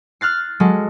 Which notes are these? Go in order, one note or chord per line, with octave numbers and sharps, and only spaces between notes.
F6 F#6 A6 C7
F#3 G#3 A4